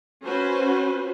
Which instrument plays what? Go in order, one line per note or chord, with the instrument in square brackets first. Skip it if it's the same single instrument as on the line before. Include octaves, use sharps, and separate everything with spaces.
[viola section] C#4 F#4 B4 C5